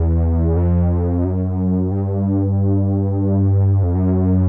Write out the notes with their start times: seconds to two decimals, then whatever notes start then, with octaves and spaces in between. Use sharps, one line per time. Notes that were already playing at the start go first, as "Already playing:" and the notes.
Already playing: E2
0.56 F2
1.25 F#2
1.91 G2
3.83 F2
3.95 F#2